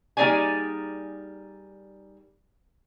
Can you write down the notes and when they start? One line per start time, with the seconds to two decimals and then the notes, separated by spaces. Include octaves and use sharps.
0.17 G3 A#3 D#4 G#4 D5 G#5